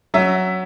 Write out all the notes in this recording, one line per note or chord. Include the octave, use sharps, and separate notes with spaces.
F#3 E5